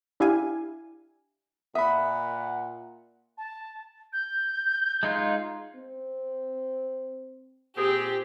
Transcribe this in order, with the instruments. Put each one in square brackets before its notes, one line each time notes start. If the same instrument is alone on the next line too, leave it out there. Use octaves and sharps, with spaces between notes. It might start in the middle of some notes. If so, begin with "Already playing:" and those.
[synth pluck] D4 E4 G4 F5 G#5
[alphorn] A#2 [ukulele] E5 [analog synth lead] F#5 [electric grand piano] B5 D#6
[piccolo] A5
G6
[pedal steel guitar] G#3 D#4 F4
[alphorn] C4
[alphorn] A#2 [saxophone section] C4 G#4 [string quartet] G4